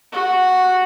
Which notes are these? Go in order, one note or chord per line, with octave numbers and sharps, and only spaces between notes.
F#4